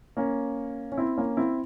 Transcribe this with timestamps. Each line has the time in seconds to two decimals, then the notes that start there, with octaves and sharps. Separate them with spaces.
0.17 A#3 C#4
0.92 C#4
0.97 C4 E4
1.17 A#3 C#4
1.37 C4 E4